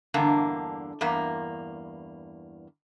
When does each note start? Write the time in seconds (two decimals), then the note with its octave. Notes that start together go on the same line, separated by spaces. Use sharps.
0.14 E2 G2 D3 A#3
1.01 E2 G2 A#3